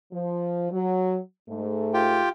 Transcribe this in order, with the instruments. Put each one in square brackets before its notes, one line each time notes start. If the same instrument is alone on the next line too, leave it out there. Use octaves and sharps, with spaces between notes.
[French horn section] F3
F#3
G#2 A3
[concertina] F4 G4 G5